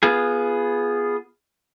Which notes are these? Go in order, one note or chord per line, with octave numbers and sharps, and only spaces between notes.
B3 F4 G#4